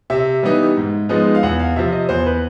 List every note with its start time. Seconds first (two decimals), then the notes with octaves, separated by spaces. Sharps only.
0.10 C3 E5
0.43 E3 G3 B3 D#4
0.77 G#2
1.09 F3 G#3 B3 D#4
1.35 F5
1.43 E2 F#5
1.59 F5
1.76 C3 F3 E5
1.92 D#5
2.09 E2 C5
2.26 B4